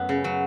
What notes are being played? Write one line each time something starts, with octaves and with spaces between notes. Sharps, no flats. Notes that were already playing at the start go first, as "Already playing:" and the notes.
Already playing: F#2 A3 B3
C#3
F#3